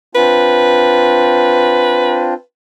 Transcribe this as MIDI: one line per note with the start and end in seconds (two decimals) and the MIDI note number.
0.15 2.34 60
0.15 2.34 62
0.15 2.34 65
0.15 2.42 71